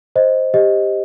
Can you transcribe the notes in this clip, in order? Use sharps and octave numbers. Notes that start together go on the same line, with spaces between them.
C5 D#5
G4 D#5